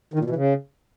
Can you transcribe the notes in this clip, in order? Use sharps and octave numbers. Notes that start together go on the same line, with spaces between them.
D#3
A#2
B2
E3
C#3